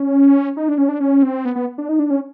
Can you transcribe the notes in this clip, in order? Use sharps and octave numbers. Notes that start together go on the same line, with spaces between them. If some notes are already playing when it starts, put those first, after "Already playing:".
Already playing: C#4
D#4
D4
C#4
D4
C#4
C4
B3
B3
D4
D#4
D4
C#4